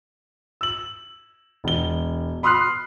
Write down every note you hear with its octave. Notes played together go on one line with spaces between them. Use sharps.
E6 F#7
E1 G7
B5 C6 D#6 F6 F#6 C7